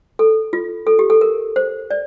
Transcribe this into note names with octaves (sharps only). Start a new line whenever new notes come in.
A4
F4
A4
G4
A4
A#4
C5
D5